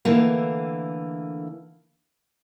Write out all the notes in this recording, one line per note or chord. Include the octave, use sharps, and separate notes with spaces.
D3 E3 A3 A#3